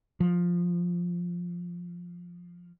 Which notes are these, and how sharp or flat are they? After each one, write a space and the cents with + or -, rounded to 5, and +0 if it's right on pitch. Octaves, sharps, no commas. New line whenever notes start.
F3 +5